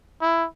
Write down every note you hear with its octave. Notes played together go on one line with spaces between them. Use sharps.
E4